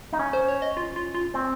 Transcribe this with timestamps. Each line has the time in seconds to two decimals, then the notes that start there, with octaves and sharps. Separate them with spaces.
0.13 D#4
0.19 C#4
0.33 C5
0.48 C#5
0.62 D#5
0.77 F4
0.96 F4
1.15 F4
1.34 C4